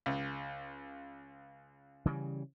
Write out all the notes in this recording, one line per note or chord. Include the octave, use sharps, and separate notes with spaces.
C#2
C#3 E3 G3